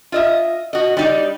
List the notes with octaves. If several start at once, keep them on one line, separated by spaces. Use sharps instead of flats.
F4 D#5 E5
F#4 D#5
G3 D#4 D5